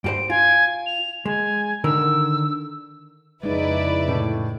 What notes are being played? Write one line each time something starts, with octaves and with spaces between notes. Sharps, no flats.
G2 G4 C5 D7
F4 G#5
F7
G#3 G#5
D3 D#3 A#4 E6
F2 C#3 G#3 D#4 E4 B4 D5
A2 A3